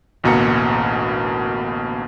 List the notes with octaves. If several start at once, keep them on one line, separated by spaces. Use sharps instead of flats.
A1 D2 B2 A#3 A#5 C#7